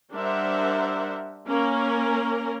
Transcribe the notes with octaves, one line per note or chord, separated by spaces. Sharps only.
G3 D4 A#4 C5 E5 F#5
A#3 C#4 A#4